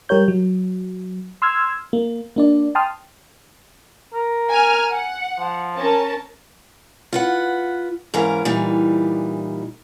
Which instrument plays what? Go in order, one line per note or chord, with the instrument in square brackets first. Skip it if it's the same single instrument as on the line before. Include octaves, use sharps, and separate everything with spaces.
[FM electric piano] G3 G4 A#4 C#5 G6
F#3
C6 E6 F6 G#6
A#3
A#3 D4 D5
G5 A5 C6 D#6 F6
[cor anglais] A#4
[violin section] G#5 F6
F#5
[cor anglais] F3
[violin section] C#4 A#4 A5
[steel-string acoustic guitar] F4 B4 F#5
G#2 E3 C#4 A#4 F5 A#5
A#2 E3 G3 D#4